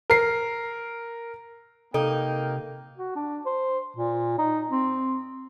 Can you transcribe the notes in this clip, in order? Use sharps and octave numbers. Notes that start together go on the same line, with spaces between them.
A#4 C7
C3 A#3 D#4 A4 A#4 G5
F#4
D4
C5
A#2
D#4
C4